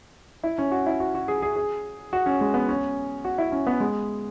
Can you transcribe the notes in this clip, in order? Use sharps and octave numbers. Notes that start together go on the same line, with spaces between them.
E4
C#4
F#4
E4
F#4
F#4
G#4
G#4
G#4
F#4
C#4
G#3
B3
C#4
F#4
E4
C#4
B3
G#3